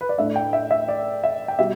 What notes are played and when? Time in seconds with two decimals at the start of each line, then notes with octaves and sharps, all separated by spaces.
0.01 B4
0.09 D5
0.18 A2 A3 D4 E5
0.36 G5
0.53 E5
0.71 E5
0.88 D5
1.24 E5
1.48 G5
1.59 B2 G3 E5